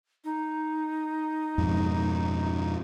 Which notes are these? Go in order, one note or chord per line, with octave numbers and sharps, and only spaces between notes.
D#4
F2 G#2 B2